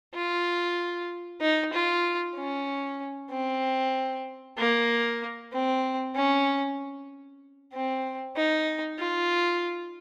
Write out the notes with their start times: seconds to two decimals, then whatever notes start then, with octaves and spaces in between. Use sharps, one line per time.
0.15 F4
1.41 D#4
1.73 F4
2.36 C#4
3.31 C4
4.57 A#3
5.52 C4
6.15 C#4
7.73 C4
8.36 D#4
8.99 F4